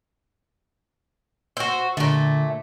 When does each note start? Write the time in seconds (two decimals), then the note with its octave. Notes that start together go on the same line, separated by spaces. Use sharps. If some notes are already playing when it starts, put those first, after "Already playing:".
1.57 F#4 C5 E6
1.97 A#2 D3 A3